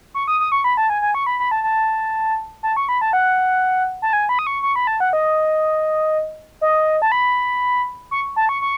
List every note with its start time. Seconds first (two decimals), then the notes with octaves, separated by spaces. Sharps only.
0.14 C#6
0.28 D#6
0.40 D#6
0.52 C#6
0.64 B5
0.77 A5
0.90 G#5
1.02 G#5
1.15 C#6
1.26 B5
1.40 B5
1.51 A5
1.64 A5
2.63 A5
2.76 C#6
2.89 B5
3.01 A5
3.13 F#5
4.02 A5
4.13 G#5
4.29 B5
4.39 D#6
4.47 C#6
4.63 C#6
4.76 B5
4.87 A5
5.00 F#5
5.13 D#5
6.61 D#5
7.02 A5
7.12 B5
8.11 C#6
8.36 A5
8.49 C#6
8.62 C#6